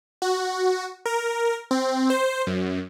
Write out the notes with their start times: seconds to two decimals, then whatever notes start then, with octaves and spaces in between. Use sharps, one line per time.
0.22 F#4
1.06 A#4
1.71 C4
2.10 C5
2.47 F#2